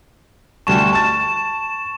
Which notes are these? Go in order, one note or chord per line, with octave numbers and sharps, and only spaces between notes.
D2 G3 A5 C#6 E7
A5 A6